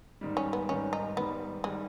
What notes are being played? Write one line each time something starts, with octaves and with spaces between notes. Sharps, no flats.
G#2 D#3 G3
C#4
B3
G#2 D#3 G3 C#4
D#4
G#2 D#3 G3 B3
D#3 G3 G#3